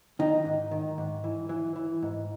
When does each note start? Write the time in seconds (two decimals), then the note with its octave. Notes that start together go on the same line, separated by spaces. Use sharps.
0.19 D#3 D#4
0.45 G#2
0.71 D#3
0.98 G#2
1.24 E3
1.49 E3
1.76 E3
2.02 G#2